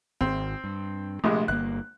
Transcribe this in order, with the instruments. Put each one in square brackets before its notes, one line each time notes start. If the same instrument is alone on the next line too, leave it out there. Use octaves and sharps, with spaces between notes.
[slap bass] G#1 [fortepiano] C4
[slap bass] G2
[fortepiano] A#1 C3 G#3 [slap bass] A3
[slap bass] G1 A#3 [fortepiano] F#6